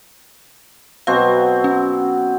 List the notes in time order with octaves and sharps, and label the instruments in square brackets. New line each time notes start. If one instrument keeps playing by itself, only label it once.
[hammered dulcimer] B2 F#3 C4 [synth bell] F5
[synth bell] C#4